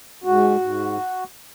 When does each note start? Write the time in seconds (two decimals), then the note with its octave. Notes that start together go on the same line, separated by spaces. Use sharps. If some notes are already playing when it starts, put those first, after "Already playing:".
0.24 G#2 F#4
0.60 G#2